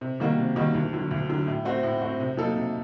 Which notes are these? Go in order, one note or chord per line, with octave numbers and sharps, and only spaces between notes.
C3
D#3 G3 A#3 F#4
C3
D#3 G3 A#3 F#4
D2
D3 F#3
D2
D3 F#3
A2
A3 C4 F#4
A2
A3 C4 F#4
C3
F#3 A#3 D#4 A4
C3